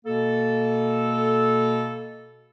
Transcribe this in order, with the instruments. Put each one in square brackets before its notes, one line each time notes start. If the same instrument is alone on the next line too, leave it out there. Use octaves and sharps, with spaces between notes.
[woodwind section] B2 A#3 A4